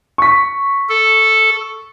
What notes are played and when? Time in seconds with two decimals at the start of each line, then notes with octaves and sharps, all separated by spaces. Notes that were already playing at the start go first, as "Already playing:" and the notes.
0.18 C#6 B6
0.89 A4